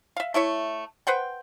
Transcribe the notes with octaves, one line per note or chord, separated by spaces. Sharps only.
E5 F5
A3 E4 C#5 E5
B4 C5 F#5 G5